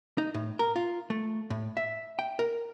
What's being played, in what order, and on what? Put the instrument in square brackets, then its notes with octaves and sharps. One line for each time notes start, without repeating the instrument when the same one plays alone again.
[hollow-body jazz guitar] D#4
A2
A#4
F4
A3
A2
E5
G5
A#4